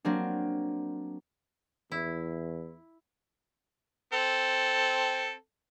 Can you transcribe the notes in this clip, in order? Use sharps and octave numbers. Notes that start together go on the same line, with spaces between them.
F#3 A#3 C4 D4
E2 E4
C4 A4